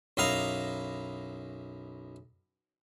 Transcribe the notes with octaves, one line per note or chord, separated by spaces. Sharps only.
B1 F#2 E4 D#5 F5 A#5